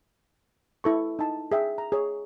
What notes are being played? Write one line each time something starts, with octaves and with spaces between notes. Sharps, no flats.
E4 A4 C#6
D#4 A5
G#4 E5 G5
A#5
G#4 C#5